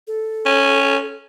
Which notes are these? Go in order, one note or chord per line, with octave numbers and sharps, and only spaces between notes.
A4
C#4